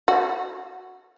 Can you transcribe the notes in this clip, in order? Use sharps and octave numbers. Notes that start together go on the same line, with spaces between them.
F#4